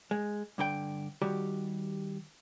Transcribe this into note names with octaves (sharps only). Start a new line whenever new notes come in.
G#3
G2 D3 A#4 G5
D#3 G3 F#4 G4